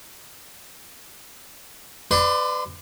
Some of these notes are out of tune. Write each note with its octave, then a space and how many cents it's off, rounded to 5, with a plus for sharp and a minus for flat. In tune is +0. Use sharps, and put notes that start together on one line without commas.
B4 +25 D5 +20 C6 -30